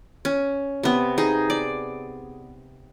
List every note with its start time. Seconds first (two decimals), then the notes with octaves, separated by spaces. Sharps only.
0.25 C#4
0.83 C3 B3
1.18 D#4 G#4
1.50 D5